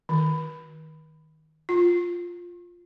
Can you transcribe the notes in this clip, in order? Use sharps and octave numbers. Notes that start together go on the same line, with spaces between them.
D#3
F4